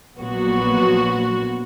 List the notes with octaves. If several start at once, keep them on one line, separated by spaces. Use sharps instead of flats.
A#1 A#2 F#3 B3 F#4